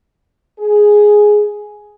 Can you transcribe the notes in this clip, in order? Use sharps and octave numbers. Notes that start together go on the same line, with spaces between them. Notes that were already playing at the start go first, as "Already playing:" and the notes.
G#4